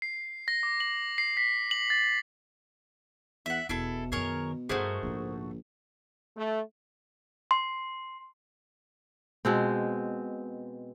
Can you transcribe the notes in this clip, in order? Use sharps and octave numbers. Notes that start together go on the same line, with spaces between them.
C7
A#6
D6
F#7
C7
B6
F#7
A6
E2 E5 F#5
E1 B2 E4 G#4 A4
F#2 D#3 G#4 A#4 C#5
G2 A3 D#4 F#4 G#4 A#4 C5
A#1 G#2 C#3
A3
C6
B2 G#3 C4